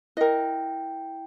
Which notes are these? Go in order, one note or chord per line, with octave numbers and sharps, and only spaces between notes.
E4 A#4 D#5 G5